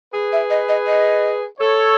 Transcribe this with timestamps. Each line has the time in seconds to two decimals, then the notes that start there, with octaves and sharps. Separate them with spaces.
0.14 G#4 B4
0.33 E5
0.50 D#5
0.69 D#5
0.87 D#5
1.60 A4 C#5